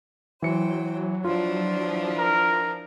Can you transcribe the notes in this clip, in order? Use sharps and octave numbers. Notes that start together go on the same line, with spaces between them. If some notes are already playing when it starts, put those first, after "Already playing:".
E3 F#3 C5 G5 C#7
E3 F3 D4 F4
A#4